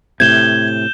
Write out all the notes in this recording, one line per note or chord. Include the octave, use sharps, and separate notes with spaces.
A2 C3 G6 G#6 E7 G7